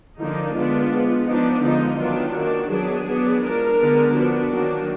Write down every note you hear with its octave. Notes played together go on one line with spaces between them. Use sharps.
D3 F3 A#3 D4 D#4
D3 G#3 B3 D4 F4
F3 G#3 B3
F3 B3 D4 D#4
D3 F3 G#3 B3 D#4
D#3 F#3 B3 D4 F4
D#3 A#3 D4 F#4
F#3 B3 D4 G#4
F#3 B3 D4
F3 G#3 D4 A#4
D3 G#3 B3 D4
F3 B3 D4 F#4
D#3 F#3 A#3 D4